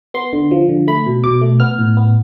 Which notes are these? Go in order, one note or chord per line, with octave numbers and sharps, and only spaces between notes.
B3 C6
D3
F3
D3
A3 B5
B2
B2 D6
A3
B3 F6
A2
B3